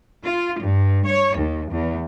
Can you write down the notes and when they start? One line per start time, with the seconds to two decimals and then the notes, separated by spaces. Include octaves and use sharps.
0.23 F4
0.61 G2
1.06 C#5
1.36 D#2
1.71 E2